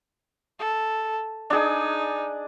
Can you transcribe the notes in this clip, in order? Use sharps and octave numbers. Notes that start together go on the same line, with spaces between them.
A4
D4 D#4 G#4